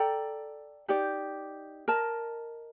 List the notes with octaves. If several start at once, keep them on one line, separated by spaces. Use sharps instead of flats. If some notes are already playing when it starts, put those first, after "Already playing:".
Already playing: A4 D5 G5 A#5
D#4 G4 D5
A#4 D#5 A5